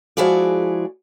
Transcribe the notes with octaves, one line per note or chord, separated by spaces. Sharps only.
F3 G#3 E4 F#4 G#4 D5